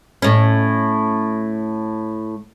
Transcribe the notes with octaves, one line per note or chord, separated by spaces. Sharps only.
A2 C#4